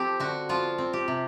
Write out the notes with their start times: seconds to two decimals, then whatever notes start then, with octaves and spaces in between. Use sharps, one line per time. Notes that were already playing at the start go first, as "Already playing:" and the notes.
Already playing: F3 C4 G4 A4
0.20 D3 F#4
0.49 F3 F4
0.78 C4
0.93 G4
1.08 C3